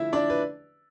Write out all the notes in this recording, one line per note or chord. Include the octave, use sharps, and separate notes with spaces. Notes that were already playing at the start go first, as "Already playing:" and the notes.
Already playing: D3 F3 A3 E4 E5
D4 D5
B4